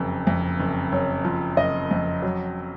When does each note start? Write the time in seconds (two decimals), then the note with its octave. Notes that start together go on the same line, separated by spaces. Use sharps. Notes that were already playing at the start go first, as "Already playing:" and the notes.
Already playing: F#1 F2
0.27 F2
0.60 F#1
0.92 F#1 C#5
1.25 F3
1.57 F#1 D#5
1.91 F2
2.22 F#3